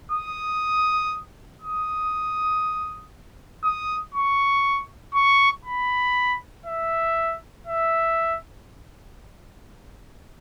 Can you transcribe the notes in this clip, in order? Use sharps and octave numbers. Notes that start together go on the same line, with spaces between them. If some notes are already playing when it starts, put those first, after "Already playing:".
D#6
D#6
D#6
C#6
C#6
B5
E5
E5